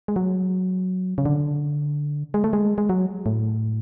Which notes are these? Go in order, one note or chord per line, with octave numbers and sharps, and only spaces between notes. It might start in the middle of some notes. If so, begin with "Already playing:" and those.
G#3
F#3
C#3
D3
G#3
A3
G#3
G#3
F#3
A2